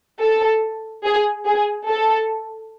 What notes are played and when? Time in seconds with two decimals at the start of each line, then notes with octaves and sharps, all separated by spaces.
0.21 A4
1.05 G#4
1.46 G#4
1.89 A4